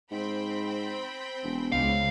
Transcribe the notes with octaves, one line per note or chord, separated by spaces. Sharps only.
G#2 C4 G5 B5
E1
C#2 F5